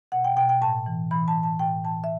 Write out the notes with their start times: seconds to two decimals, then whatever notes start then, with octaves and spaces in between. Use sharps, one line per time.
0.12 B2 F#5
0.24 G5
0.37 B2 G5
0.49 G5
0.62 A2 A5
0.86 E3
1.11 E3 B5
1.28 A5
1.35 A2
1.43 A5
1.59 A2 G5
1.84 E3 A5
2.04 E5